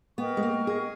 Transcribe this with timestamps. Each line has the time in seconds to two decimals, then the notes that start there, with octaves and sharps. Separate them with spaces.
0.18 B3 A#4 D#5 G5 C#6
0.37 G#3
0.43 A#3
0.67 G#4